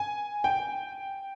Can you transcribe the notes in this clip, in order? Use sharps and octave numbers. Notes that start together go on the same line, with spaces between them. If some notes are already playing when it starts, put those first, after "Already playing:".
Already playing: G#5
G5